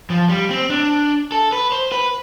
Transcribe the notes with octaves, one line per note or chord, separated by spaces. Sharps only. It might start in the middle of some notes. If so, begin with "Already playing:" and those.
F3
G3
C4
D4
A4
B4
C5
B4